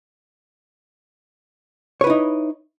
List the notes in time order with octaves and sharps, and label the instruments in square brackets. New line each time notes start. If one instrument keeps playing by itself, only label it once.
[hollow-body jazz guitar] C#5
B4
E4
D#4